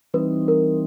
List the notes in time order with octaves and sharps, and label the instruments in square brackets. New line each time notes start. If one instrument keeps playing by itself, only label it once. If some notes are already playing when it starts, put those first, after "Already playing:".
[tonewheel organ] E3 G3 C4 D#4 [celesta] B4
[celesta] A#4